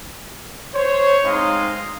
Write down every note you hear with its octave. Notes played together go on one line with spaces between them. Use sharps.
C5 C#5
G#3 C4 D#4 D#5 F5 C6